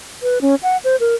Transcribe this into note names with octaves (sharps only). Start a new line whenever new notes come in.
B4
C#4
F#5
C5
A#4